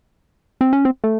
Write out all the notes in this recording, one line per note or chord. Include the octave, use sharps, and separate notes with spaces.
C4
C#4
C4
A3